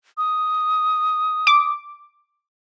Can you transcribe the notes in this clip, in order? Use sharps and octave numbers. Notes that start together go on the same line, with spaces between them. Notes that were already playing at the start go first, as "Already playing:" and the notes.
D#6
D6